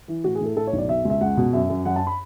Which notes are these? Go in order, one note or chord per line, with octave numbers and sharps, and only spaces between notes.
E3
A2 F#4
G#4
A2 A4
A2 A4
C#5
B1
D5
B2 E5
C#2
E5
C#2 F#5
B2
F#2 E5
F#2
F#2 F#5
A5
B5